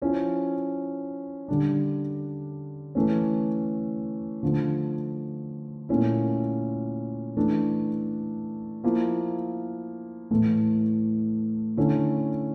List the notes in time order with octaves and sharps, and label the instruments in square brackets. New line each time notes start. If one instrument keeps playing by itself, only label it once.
[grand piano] F3 C#4 E4
D3 G3 D4
E3 A3 C#4
D3 F3 A3
A#2 A3 C#4 E4
E3 A3 D4
F3 A#3 E4
A2 E3 A3
D3 A3 C#4 E4